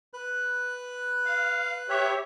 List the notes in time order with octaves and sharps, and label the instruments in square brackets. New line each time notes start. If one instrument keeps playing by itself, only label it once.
[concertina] B4 F#6
[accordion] F5
G4 C#5 E5